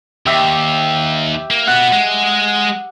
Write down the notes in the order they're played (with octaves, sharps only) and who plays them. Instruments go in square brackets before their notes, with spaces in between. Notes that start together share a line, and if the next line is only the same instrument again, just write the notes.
[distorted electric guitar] D#2 [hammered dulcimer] G4 E5
[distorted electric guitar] A#3
[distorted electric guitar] B3 F#4 [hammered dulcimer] F#5
[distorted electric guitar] G#3